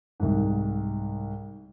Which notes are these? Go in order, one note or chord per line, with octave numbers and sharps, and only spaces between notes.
C2 G#2